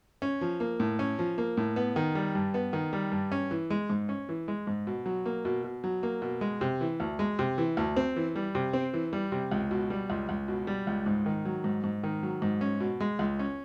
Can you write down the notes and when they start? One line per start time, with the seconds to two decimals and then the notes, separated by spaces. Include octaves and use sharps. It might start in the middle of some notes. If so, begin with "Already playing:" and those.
0.22 C#4
0.41 F3
0.60 A#3
0.80 A2
0.99 C#4
1.19 F3
1.38 A#3
1.57 A2
1.76 B3
1.96 D#3
2.15 G3
2.35 G2
2.54 B3
2.73 D#3
2.93 G3
3.12 G2
3.32 C#4
3.51 E3
3.70 G#3
3.90 G#2
4.09 C#4
4.29 E3
4.48 G#3
4.67 G#2
4.87 B2
5.06 F#3
5.26 A#3
5.45 B2
5.64 B2
5.84 F#3
6.03 A#3
6.22 B2
6.41 G#3
6.61 C3
6.81 E3
7.00 D2
7.19 G#3
7.39 C3
7.58 E3
7.77 D2
7.97 C4
8.16 E3
8.36 G3
8.55 C3
8.73 C4
8.94 E3
9.13 G3
9.32 C3
9.51 C#2
9.71 B2
9.90 G3
10.10 C#2
10.29 C#2
10.48 B2
10.67 G3
10.87 C#2
11.06 G#2
11.26 D#3
11.45 F#3
11.64 G#2
11.84 G#2
12.03 D#3
12.23 F#3
12.42 G#2
12.61 C#4
12.80 B2
13.00 G#3
13.19 C#2
13.39 C#4